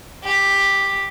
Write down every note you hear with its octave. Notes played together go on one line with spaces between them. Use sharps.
G4